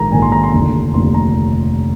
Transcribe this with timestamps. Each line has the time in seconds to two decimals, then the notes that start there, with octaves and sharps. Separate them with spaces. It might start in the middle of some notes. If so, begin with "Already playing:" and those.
Already playing: A#1 G#2 D#3 A#3 A#5
0.12 A#1 G#2 D#3 A#3 G#5
0.22 C6
0.32 A#5
0.43 C6
0.53 F1 D#2 D3 F3
0.94 F1 D#2 D3 F3 C6
1.14 A#5